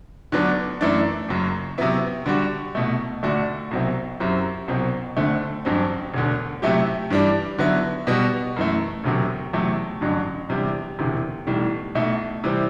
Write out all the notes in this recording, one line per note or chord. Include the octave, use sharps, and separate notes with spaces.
D2 D3 F#3 B3 D4
F#2 E3 A3 D4
F#1 F#2 F#3
C3 F#3 B3 E4
D3 G3 D4 F#4
C2 B2 A3
D2 D3 A3 D4 F#4
C2 B2 F#3 C4 E4
F#2 F#3 C4 E4 G4
C2 B2 F#3 C4
D2 D3 A3 C4
A1 G2 F#3 C4
E1 D2 D3
C3 F#3 A3 E4 G4
G2 E3 G3 D4
D3 F#3 B3 E4
B2 G3 B3 F#4
F#2 E3 A3
E1 D2 C3 F#3
E2 C3 F#3 A3
A1 G2 D3 F#3
E2 C3 E3 G3 D4
E1 D2 C3 E3
B1 A2 E3 G3
B1 B2 A3 E4
C3 E3 G3 C4